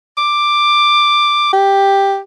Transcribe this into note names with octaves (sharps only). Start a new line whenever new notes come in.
D6
G4